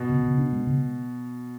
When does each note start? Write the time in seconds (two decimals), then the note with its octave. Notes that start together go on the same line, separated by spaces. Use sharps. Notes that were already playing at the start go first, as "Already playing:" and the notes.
Already playing: B2
0.09 C#3
0.23 C#3
0.38 D4
0.52 G#3
0.67 C#3